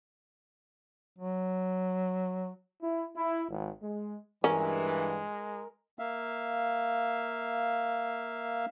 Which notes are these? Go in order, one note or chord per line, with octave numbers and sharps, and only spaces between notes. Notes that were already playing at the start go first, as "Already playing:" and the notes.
F#3
E4
E4
G#1
G#3
G2 E3 G#3 C#4 A#4
A#3 E5 F5